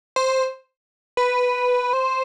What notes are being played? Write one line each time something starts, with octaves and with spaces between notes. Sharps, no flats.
C5
B4
C5